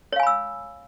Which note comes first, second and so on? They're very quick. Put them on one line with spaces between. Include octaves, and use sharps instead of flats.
C#5 F5 G#5 B5 E6